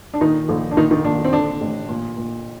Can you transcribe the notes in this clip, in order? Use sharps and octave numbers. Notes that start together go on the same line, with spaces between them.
D4
A#2 D#3 D#4
A#1
D4
A#2 D#3 D#4
D#3 D#4
A#2 D4
C4
D3 D4
A1
A#2
A#2